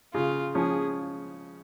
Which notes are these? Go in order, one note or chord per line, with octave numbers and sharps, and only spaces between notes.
C#3 F4
F3 C#4 G#4